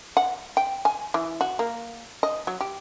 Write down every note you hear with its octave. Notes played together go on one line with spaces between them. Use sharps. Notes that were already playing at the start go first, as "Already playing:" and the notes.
F#5
G5
G#5
E3
F#4
A#3
D#5
F#3
G4